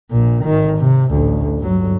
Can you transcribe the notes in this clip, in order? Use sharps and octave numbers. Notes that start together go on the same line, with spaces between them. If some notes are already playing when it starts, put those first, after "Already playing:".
A#1 A#2
G#1 D#3
C3
A1 D2
G1 F#3